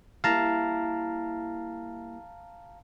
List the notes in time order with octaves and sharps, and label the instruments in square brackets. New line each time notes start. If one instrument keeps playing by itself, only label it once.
[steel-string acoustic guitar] G3 A#3 E4 [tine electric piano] F5 A5 A#5